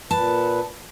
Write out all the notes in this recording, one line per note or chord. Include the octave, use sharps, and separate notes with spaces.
A#2 B4 A5